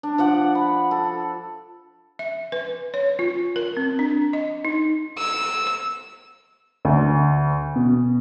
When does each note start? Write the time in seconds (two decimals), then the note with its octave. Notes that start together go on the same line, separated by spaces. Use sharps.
0.03 D4
0.18 F3 D5 F#5
0.55 B5
0.91 A4
2.19 E5
2.52 B4
2.94 C#5
3.19 F4
3.56 A#4
3.77 C4
3.99 D4
4.33 D#5
4.65 D#4
5.18 E6
6.85 D2
7.76 B2